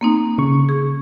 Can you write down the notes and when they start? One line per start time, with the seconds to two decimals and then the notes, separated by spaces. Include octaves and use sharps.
0.01 A#3 C4 D#4
0.38 C#3 C#6
0.69 G#4